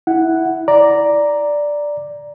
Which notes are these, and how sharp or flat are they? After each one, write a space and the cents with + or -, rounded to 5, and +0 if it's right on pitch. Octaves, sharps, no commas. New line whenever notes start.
E4 -10 F#5 +0
D5 +0 A#5 +0